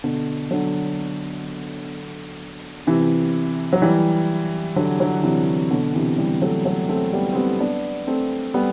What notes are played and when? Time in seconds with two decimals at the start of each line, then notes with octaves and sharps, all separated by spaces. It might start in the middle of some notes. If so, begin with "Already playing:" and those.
0.04 B2 D3
0.51 D3 F#3
2.87 C3 E3
3.73 F#3
3.82 E3 G3
4.76 D3 F#3
5.00 D3 F#3
5.23 C3 E3
5.71 B2 D3
5.95 C3 E3
6.18 E3 G3
6.41 F#3 A3
6.65 F#3 A3
6.89 A3 C4
7.13 G3 B3
7.32 C4
7.36 G3 B3
7.60 B3 D4
8.07 A3 C4
8.54 G3 B3